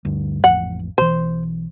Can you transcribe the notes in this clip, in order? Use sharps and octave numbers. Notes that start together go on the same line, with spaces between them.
D2 G2
A1 F2 F#5
B1 E3 C5